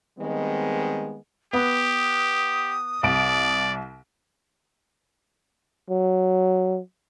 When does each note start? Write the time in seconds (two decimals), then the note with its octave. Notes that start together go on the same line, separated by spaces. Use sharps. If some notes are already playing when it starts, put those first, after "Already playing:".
0.19 D#3 G3 G#3 B3 C4
1.53 B3 G4 D#6
3.03 C2 D5 D7
5.90 F#3